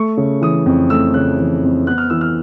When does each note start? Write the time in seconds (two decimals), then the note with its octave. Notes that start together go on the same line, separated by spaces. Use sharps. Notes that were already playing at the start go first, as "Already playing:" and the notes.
Already playing: A3 C#6
0.17 C#3
0.42 E3 D#6
0.66 F2
0.90 A3 E6
1.14 C#3 F#6
1.39 E3
1.64 F2
1.87 B3 F#6
1.98 F6
2.10 E3 E6
2.21 F6